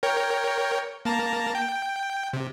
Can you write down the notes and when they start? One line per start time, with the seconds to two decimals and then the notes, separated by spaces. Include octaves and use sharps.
0.03 A#4 C#5 G5
1.05 A#3 A5 A#5
1.55 G5
2.33 C3